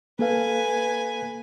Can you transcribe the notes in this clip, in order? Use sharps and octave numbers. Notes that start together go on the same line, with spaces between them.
A#3 A4 B4 F5 G#5